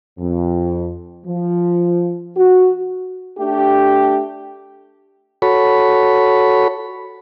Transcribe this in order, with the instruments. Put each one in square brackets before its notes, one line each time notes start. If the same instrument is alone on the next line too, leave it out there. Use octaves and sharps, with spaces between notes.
[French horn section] F2
F3
F#4
A3 D4 G4
[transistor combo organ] F#4 A4 C#5 B5